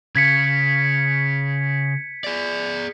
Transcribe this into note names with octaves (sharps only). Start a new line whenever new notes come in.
C#3 G#6 B6 C#7
G#4 D5